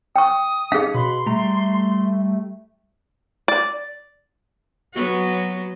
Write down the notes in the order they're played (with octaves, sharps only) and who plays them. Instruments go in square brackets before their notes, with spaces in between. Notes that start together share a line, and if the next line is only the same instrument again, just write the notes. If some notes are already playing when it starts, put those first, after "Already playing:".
[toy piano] G5 C#6 [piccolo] D#6
[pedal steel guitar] C#4 D#4 C#5 [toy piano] G#4 F5
[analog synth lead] B2 [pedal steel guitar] B4 B5 [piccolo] C6
[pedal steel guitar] G3 A#5 [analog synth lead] A3
[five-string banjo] D5
[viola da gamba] F#3 B3 F#4